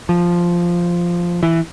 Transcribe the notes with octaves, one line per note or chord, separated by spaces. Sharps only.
F3
E3